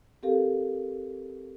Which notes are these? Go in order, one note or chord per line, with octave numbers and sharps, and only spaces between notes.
C4 G4 A4 A#4 F5